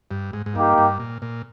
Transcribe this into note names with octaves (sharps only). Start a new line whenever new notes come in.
G2
G#2
G#2
G2 A#3 D#4 G4
G2
A#2
A#2